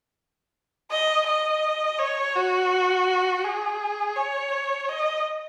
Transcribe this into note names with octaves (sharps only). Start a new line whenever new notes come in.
D#5
D#5
C#5
F#4
G#4
C#5
D#5